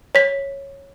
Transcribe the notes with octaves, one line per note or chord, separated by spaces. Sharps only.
C#5 B6